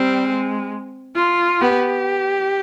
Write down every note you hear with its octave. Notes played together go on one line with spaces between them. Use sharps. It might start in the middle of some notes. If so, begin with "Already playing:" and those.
Already playing: G3 C4
G#3
F4
B3 G4